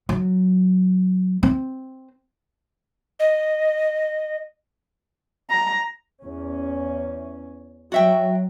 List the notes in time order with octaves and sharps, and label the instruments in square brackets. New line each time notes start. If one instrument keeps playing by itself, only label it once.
[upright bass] F#3
C4
[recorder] D#5
[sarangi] A#5
[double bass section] E2 C#4
[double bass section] F#3 [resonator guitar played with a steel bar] F#4 E5 G5